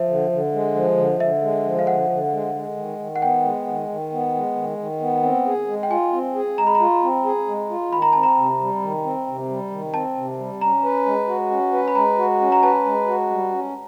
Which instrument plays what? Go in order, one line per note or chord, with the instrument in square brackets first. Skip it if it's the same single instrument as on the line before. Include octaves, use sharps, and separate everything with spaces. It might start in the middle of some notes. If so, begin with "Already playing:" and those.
Already playing: [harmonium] F3 [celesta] E5
[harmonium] D3
D3
G#3
F3
D3
[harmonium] D3 [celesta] E5
[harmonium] G#3
F3
[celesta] F5
[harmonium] D3 [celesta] F#5
[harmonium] D3
G#3
G#3
D#3
D#3
[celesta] F#5
[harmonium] B3 [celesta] G5
[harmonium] G#3
D#3
D#3
B3
G#3
D#3
D#3
B3
C4
G#4
G#3
[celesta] G5
[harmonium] F4 [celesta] G#5
[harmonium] C4
G#4
[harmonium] G#3 [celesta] A#5
[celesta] B5
[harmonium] F4 [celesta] A#5
[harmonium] C4
G#4
G#3
F4
[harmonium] D#3 [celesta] B5
[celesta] A#5
[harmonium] C4 [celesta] A5
[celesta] A#5
[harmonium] C3
G3
D#3
C4
C3
G3
D#3
[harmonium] C4 [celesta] A5
[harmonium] C3
G3
[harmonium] C#4 [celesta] A#5
[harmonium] B4
G#3
F#4
C#4
B4
[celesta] B5
[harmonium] G#3 [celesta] A#5
[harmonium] F#4
C#4
[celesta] A#5
[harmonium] B4 [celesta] A5
[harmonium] G#3
F#4
G3
C#4